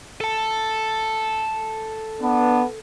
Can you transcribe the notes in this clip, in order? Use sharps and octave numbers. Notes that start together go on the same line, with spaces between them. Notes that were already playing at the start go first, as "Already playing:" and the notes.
A4 A5
B3 D4